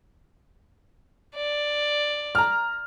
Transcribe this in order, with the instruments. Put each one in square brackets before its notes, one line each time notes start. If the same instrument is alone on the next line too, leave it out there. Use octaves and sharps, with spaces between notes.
[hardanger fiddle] D5
[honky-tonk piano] A#5 F6